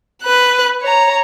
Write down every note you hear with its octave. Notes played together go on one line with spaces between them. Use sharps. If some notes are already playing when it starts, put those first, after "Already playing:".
B4 F#6
C#5 A#5